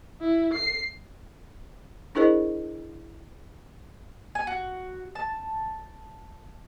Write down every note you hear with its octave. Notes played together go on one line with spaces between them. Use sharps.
E4
C7
D4 E4 G#4 A#4 C5 D#5
G#5
F#4
A5